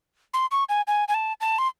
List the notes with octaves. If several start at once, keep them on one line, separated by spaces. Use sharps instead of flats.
C6
C#6
G#5
G#5
G#5
A5
A5
C6